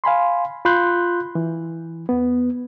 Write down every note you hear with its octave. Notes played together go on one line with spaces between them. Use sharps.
F5 G#5 B5 C6
F4 B5 C6 F#6 G6
E3
E2 B3